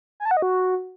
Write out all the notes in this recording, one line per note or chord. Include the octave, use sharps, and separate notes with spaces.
G#5
A5
F#5
D#5
F#4